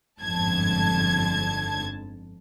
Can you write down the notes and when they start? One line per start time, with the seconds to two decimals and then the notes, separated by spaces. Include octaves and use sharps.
0.20 G1 F2 G#2 D3 A5 G#6